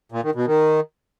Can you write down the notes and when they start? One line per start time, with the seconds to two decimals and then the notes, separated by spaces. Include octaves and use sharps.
0.12 A#2
0.23 D#3
0.35 B2
0.46 D#3